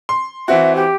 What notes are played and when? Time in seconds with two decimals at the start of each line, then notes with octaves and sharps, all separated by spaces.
0.09 C6
0.48 E3 C4 F#4 E5
0.75 G4